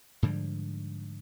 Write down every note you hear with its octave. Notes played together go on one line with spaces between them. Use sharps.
G#2 D3 F3 G3